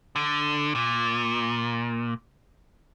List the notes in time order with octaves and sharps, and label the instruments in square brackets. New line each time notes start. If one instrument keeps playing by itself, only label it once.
[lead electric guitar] D3
A#2